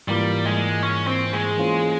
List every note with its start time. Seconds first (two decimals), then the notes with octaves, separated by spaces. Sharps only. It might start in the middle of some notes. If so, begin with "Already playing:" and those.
0.08 G#2 E3 G3 A#3 F4 A#4
0.45 G#3
0.82 C#4
1.07 C4
1.33 G#3
1.57 E3 A#3 C#4 F4 C5